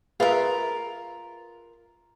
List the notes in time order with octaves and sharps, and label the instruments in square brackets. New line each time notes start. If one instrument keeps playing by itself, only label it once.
[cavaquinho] F4 A#4 [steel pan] G#4 B4 E5